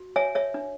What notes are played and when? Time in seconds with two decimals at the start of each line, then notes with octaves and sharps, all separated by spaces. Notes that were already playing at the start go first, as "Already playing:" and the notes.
Already playing: F#4
0.16 C#5 E5 G#5
0.35 C#5 E5
0.54 D4